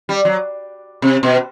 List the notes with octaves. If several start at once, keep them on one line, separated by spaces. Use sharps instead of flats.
G3
F#3
C3
B2